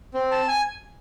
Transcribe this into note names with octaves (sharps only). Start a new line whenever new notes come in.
C4
A5
G#5